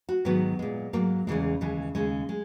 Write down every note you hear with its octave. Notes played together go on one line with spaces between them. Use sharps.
F#4
G#2 D#3 F#3 B3
A#2 G#3
G#2 F#3 A#3
E2 C#3 E3 G#3
D#2 C#3 E3 G#3
D#2 C#3 G#3
G#3